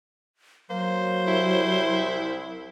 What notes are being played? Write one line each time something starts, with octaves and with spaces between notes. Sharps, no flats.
F#3 A#3 C5
C2 E4